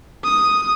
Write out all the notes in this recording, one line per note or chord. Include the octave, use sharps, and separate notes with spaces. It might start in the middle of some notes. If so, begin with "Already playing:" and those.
D#6